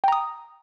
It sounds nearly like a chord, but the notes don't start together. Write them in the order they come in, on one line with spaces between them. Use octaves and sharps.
G5 A#5 D#6